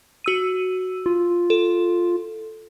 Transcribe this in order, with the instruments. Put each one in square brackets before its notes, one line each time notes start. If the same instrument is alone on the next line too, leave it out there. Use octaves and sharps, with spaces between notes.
[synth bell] F#4 E6 D#7
[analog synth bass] F4
[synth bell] A4